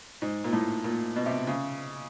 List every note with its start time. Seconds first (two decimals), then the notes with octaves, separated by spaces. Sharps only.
0.22 G#2
0.44 A#2
0.53 A2
0.84 A#2
1.16 B2
1.26 C3
1.47 C#3